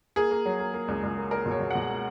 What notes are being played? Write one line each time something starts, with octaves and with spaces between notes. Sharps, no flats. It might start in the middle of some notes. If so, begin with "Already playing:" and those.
A#3 G#4
A#3
F#3
A#3
A#3
C#2
C#2
A#3
A#3 A#4
B2
C#5
B2
B2 F#5
A#3